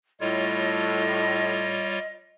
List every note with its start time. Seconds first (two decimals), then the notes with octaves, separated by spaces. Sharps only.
0.21 A2 G3 F4 C#5 D#5